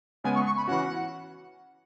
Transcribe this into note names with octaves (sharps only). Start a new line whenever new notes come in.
C#3 G#3 B3 G#5
C#6
C#6
B5
E3 C#4 F#4 F#5